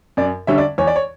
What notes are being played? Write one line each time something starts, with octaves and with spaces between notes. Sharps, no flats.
F#2 D5
D3 G3 C#4 E5
D5
E2 C#5
D5
C#5